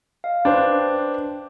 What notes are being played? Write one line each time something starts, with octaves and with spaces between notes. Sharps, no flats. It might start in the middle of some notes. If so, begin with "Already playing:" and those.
D#5 F5
D4 B4 C5 G5